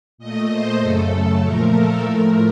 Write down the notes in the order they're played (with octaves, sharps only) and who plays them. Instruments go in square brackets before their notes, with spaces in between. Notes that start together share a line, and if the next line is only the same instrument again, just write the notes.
[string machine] A#2 A3 D#5
C5
F#2 C#3 A3 A4
A#2 F3 A3 A#4
A4
A2 F3 A3 A#4